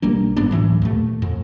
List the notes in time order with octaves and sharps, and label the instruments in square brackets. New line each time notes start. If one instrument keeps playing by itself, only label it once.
[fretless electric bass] B1 G3 A#3 D4
F#1 G#2 B3 D4
D2 A2 E3 F#3
D#2 A#2 A3
F2